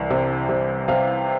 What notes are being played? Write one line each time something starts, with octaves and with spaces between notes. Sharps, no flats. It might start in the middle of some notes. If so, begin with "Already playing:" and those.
Already playing: C2 E3
C3
C3
C3 F5